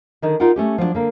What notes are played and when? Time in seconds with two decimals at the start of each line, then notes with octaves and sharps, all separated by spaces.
0.22 D3 D#3 D#4
0.40 D#4 F4 A#4 F#5 G5
0.56 A3 C#4 G4
0.78 F3 F#3 A#3 D4
0.95 D3 A#3